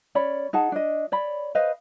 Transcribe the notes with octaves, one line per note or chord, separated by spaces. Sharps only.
C#4 C#5 D5 B5
D#4 G#4 F#5 A5
D4 D#5
C#5 D5 B5
B4 C5 D#5 F5